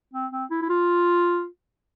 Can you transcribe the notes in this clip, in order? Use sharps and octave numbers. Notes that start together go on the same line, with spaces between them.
C4
C4
E4
E4
F4